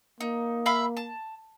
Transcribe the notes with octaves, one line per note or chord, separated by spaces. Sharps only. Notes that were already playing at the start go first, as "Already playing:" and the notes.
A#3 D#4
E5 F5 B5
A5